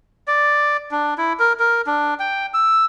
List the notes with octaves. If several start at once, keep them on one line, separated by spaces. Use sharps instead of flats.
D5
D4
E4
A#4
A#4
D4
G5
E6